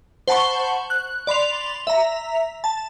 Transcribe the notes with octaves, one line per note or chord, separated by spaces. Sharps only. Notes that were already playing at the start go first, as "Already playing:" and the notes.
C5 F#5 A5 B5 C#6
F#6
D5 B5 C6 F7
E5 A#5
A5